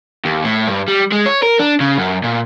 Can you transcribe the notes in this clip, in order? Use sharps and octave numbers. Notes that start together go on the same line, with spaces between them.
D#2
A2
G2
G3
G#3
C#5
A#4
D4
C#3
F#2
A#2